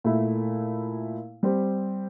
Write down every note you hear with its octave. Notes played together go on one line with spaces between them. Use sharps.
A#2 A3 E4
G3 C4 G4